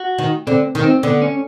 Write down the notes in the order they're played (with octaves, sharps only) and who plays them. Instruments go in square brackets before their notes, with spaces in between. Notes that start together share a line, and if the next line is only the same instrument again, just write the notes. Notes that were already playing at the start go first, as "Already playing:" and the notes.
Already playing: [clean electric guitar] F#4
[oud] D#3
[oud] D3 [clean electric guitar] C4
[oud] D#3
[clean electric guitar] C4
[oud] D3 [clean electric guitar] B3
[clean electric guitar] C#4